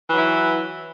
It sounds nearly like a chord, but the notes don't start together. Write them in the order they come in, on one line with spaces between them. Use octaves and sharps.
E3 F#3 E4